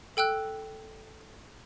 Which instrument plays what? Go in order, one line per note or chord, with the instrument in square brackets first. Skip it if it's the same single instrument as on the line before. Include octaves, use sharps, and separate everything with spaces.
[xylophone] A4 G5 E6 F#6